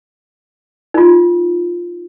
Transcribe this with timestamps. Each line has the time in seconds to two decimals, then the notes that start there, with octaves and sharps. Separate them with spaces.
0.94 D#4 F4